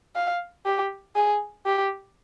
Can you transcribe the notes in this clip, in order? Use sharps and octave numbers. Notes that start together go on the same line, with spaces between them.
F5
G4
G#4
G4